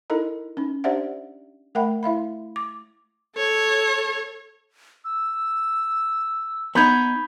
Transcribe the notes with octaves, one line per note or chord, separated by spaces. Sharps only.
D#4 E4 A4 A#4 D#5 A#5
C#4 D#4
D4 G4 C5 D5 E5 F#5
A3 A#4 E5 F#5 G5 B5
E4 E5 F5 B5
D6
A4 C#5
E6
B3 D#4 B5 G6 G#6